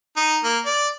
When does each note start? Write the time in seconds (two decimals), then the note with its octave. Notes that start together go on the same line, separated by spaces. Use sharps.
0.17 D#4
0.44 A#3
0.66 D5